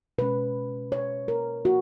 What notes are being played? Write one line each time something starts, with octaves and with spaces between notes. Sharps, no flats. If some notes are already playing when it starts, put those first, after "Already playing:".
B2 G#3 C#4 B4
C#5
A#4
F3 A#3 F#4